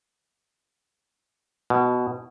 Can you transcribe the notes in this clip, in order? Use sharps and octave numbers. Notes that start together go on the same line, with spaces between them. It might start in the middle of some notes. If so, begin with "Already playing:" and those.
B2